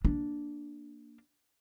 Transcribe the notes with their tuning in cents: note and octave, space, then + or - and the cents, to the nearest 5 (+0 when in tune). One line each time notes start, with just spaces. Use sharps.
A#3 +0 D4 +0